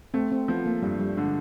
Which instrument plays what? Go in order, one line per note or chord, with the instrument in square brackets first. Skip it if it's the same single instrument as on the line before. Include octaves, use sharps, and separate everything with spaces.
[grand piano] A3 [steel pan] C4
[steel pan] C4
[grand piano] F3 [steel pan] B3
[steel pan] A#3
[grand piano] G2 [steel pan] G3
[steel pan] G3
[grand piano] D3 [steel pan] G#3